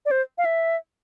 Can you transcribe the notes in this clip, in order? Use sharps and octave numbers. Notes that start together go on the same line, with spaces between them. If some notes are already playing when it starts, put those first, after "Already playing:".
D5
C5
F5
E5